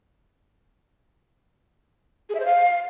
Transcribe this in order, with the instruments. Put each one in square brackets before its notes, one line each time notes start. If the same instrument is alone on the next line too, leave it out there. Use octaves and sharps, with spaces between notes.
[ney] G#4
E5
C5
F5